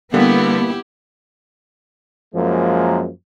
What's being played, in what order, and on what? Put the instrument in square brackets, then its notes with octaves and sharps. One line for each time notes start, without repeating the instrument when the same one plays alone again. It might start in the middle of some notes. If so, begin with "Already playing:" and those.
[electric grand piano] D3 G3 [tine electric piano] A#3 [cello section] B3 [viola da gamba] E4 G4
[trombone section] F#2 F3 G#3 A#3